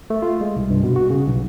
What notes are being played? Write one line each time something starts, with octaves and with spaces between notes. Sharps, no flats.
A3
F4
G#3
C2
G2
B2
F#4
C#3
B1